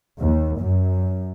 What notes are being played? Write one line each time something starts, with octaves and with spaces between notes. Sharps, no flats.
D#2
F#2